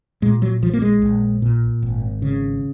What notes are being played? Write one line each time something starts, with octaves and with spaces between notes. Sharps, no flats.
A#2 G#3
F#3
A#1 F3
A#3
G#3
A#1
A#2
G#1
C#3